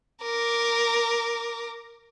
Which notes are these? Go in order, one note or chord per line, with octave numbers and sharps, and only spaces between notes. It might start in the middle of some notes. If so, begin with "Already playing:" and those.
A#4 D6